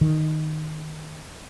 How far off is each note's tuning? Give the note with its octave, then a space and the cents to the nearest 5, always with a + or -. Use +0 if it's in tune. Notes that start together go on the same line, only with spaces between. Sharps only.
D#3 -5